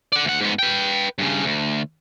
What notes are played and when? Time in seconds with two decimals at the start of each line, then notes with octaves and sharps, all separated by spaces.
0.12 D5 F#5
0.25 D2 F#5
0.41 G#2 B3
0.59 B4 G5
1.18 G2 C#3
1.45 D2